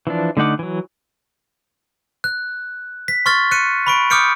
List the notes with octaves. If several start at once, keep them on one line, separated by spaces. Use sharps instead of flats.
E3 F3 D4
D3 A3 D#4 F#5 D6
E3 F#3
F#6
B6
C6 C#6 F6 A6
F#6 C#7 D#7
B5 C#6 D7
D6 D#6 F6 G6 C#7 D7